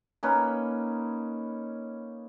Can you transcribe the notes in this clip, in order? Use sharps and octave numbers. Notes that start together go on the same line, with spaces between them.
A#3 C#4 D#4 B4